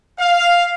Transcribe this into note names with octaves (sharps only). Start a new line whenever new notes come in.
F5